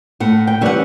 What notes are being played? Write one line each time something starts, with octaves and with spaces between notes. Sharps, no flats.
A2 F#5
G5
E3 G3 C#4 E4 F#5